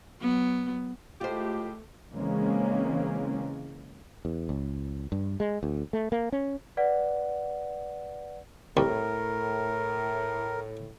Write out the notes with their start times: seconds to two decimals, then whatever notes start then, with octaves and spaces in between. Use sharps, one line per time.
0.21 F#3 B3
1.21 A2 G#3 A3 F4 G4 C5
2.14 C#3 E3 G#3 A#3 C4 C#4
4.25 E2
4.49 C#2
5.12 G2
5.40 G#3
5.63 D2
5.93 A3
6.12 A#3
6.32 C#4
6.77 B4 D5 F#5
8.77 C2 A2 A#4